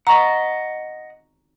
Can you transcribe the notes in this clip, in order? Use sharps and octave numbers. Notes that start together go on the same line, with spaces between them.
D#5 F#5 A#5 C#6